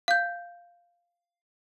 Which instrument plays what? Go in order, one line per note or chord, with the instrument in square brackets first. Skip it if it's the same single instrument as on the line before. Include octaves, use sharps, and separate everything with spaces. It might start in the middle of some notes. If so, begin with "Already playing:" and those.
[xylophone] F5 G6